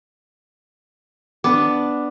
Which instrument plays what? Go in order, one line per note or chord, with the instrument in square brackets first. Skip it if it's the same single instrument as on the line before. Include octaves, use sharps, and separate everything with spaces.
[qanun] B3 D4 [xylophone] D6